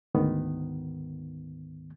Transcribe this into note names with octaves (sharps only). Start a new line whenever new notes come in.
D2 G#2 D#3 B3